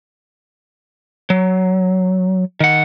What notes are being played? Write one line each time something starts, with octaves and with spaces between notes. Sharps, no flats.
F#3
D#3 F#5